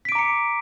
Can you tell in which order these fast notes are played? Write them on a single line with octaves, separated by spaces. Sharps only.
B6 D7 D6 A#5 C#7